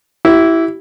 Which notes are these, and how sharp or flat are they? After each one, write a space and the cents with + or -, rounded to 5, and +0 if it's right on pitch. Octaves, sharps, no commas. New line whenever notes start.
E4 +0 G4 -35